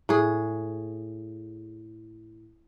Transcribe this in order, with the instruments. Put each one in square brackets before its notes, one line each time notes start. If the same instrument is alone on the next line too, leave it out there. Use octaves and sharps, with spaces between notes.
[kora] A2 G#4